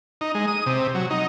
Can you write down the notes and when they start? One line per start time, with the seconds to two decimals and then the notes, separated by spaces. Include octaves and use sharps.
0.21 D#4
0.35 G#3
0.48 D#6
0.66 C3
0.95 F#3
1.10 D#4